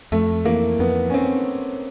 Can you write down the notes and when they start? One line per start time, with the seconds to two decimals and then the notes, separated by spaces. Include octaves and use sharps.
0.12 F2 A3
0.45 E3 A#3
0.79 F2 B3
1.10 C#4
1.14 C4